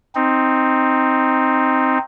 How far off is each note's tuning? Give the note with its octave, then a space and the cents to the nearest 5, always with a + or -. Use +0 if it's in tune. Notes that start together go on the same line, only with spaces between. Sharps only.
C4 +0 D#4 +0